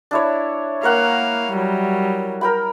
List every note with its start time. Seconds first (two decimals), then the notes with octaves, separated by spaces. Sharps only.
0.11 D4 E4 C#5
0.83 A#3 A#4 C#5 F5 F#5
1.52 F#3 G3
2.41 A#4 G5 B5